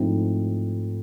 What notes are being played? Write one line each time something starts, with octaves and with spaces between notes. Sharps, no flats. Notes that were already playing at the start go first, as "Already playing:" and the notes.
Already playing: G#2 F3 A3 C4 E4